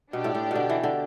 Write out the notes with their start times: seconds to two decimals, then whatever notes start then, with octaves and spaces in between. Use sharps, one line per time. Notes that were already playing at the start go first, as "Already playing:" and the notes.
0.13 B2 D4 G4 D5 G5
0.24 A2
0.35 A2
0.51 B2 D3
0.69 E3
0.84 D3